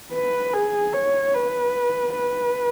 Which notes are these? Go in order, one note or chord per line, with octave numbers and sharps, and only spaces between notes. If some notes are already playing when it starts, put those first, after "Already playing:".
B4
G#4
C#5
B4
B4